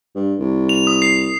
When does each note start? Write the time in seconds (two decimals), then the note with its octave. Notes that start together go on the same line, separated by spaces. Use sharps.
0.15 G2
0.39 C2
0.69 F7
0.87 D#6
1.02 C7